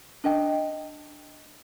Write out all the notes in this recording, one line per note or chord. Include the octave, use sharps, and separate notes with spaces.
D4 D#5 G5